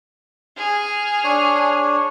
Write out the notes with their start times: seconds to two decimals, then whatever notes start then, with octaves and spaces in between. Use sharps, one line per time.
0.57 G#4 F6
1.24 D4 C#5